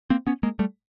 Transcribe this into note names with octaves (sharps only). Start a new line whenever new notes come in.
A#3 C4
B3 C#4
G#3 A#3
G3 A3